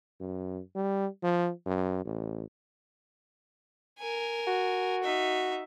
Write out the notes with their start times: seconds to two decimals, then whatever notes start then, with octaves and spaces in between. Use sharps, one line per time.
0.21 F#2
0.75 G3
1.23 F3
1.66 F#2
2.05 A1
3.99 A#4 G#5
4.47 F#4
5.03 D#4 E5